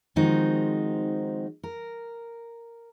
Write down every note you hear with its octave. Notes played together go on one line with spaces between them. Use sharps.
D#3 F3 G#3 C4 D#4 F#4
A#4